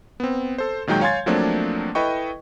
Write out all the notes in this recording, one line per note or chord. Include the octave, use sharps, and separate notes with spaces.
B3 C4
A4 C5
A#2 D#3 F#3 G#3 G5 G6
C#5 F5 G#5 C6 G#6 A6
F3 F#3 A3 A#3 C4 D4
E4 A4 B4 D#5 G5 C#6